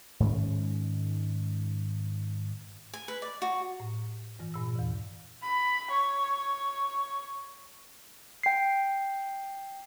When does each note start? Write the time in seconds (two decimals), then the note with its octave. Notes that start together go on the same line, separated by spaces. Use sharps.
0.20 G#2 D#3 G#3 C#4
2.94 G#5
3.08 B4
3.22 D5
3.42 F#4
3.80 A2
4.39 G2 E3
4.54 G2 A#2 E6
4.75 E2 E3
5.42 B5
5.90 C#5
8.43 G5 C7